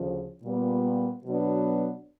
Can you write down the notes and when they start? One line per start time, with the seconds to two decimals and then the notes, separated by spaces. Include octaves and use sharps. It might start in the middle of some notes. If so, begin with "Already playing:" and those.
Already playing: D2 C#3 F3
0.43 A#2 G3 B3
1.25 B2 F#3 B3 D4